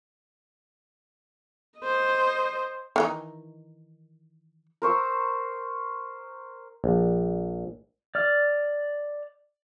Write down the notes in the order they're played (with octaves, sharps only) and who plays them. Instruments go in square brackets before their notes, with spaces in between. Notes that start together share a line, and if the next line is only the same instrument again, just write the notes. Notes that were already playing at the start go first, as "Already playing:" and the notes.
[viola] C5 D#5
[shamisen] D#3 E3 D#4
[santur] A#4 C5 C#6 E6
[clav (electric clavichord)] A#1
[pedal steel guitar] D5 F6